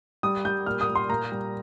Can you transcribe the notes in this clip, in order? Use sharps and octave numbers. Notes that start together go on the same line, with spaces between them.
G3 D#6
G3 G6
A#2 F6
D#6
A#2
C6
A#2 A#5
G3